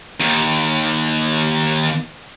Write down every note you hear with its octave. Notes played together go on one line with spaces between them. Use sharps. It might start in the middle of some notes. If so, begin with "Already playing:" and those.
D#2 D#3